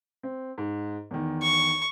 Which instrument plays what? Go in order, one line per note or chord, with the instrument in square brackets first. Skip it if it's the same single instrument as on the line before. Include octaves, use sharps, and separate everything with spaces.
[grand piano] C4
G#2
E2 D#3
[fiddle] C#6